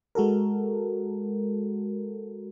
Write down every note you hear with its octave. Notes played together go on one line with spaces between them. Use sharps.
G#3 F#4 A4 A#4